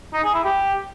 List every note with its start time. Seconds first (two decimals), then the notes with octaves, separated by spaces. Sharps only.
0.13 D#4
0.24 G#4
0.34 E4
0.44 G4